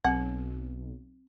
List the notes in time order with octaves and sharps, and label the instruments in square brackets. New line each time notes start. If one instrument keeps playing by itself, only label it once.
[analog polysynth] B1 [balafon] C4 [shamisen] F#5